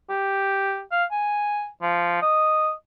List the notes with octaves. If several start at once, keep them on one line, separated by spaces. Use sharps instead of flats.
G4
F5
G#5
F3
D#5